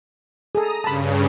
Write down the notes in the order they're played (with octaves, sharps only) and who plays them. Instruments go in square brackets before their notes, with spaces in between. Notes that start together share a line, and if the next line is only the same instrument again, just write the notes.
[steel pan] G#4 A4 [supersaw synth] A#5 D#6
[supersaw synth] G2 C#3 [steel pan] A5 B5